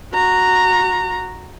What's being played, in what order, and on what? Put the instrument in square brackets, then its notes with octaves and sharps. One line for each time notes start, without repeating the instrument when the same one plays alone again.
[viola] F#4 A#5